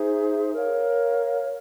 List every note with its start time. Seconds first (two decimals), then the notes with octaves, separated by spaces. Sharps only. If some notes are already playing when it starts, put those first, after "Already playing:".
Already playing: D#4 G#4 C5 E5
0.52 A#4 C#5 F5